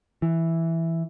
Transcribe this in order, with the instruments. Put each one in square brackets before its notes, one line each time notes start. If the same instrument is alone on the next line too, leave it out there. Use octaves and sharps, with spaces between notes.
[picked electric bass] E3